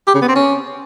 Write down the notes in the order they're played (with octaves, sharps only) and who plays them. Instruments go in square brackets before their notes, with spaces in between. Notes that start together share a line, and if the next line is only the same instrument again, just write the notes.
[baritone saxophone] G4
C#3
B3
C4
C#4